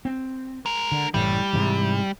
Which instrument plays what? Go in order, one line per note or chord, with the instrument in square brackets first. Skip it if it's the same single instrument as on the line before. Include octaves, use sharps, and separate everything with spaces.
[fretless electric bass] C4
[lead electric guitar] G#3 A#4
[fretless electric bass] D3
[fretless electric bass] F#1 A2 E3 [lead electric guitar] G3
[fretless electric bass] G#2 C3 E3